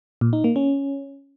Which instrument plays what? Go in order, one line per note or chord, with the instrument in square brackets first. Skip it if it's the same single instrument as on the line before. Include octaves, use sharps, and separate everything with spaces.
[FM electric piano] A#2
D#4
A#3
C#4